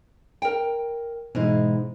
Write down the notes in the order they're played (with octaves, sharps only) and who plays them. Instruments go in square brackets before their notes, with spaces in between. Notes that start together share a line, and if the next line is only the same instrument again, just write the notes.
[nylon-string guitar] A#4 G5
[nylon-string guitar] G#2 D#4 E4 [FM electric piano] B2 E3 G#3